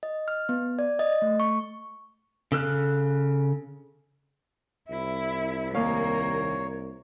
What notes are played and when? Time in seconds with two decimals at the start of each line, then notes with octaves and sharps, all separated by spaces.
0.03 D#5
0.28 F6
0.49 B3
0.79 D5
0.99 D#5
1.22 A3
1.40 C#6
2.52 C#3 A4 F6 F#6
4.90 C2 E4
5.75 D#2 A#3 C#5 F5